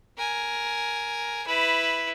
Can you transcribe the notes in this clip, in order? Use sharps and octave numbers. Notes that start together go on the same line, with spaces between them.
A#4 G#5
E4 B4